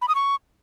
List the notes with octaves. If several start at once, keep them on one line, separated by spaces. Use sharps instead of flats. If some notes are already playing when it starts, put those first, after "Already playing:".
B5
D#6
C#6